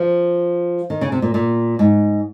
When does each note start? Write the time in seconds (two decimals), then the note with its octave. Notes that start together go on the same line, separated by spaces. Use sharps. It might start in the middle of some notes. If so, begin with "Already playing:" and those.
Already playing: F3
0.90 D#3
1.01 C#3
1.12 C3
1.22 A#2
1.34 A#2
1.79 G#2